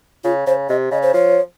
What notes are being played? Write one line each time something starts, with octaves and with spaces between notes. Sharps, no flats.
C#3 F4
C#3 C5
C3 D#5
C#3 D#5
C5
F3 C#5